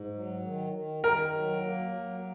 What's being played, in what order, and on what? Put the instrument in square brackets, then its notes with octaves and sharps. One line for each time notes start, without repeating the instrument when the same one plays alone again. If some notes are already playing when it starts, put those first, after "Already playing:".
Already playing: [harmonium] G#2
F#3
D#3
D#3
[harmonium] D#3 [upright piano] A#4
[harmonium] F#3
A#3
F#3